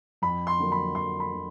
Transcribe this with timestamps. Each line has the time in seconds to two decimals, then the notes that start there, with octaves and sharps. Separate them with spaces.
0.22 F2 B5
0.47 C6
0.59 D3 F#3 A#3
0.72 B5
0.95 F2 C6
1.20 B5
1.32 D3 F#3 A#3